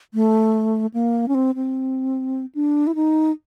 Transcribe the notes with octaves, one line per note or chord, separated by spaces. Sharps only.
A3
A#3
C#4
C4
C4
D4
E4
D#4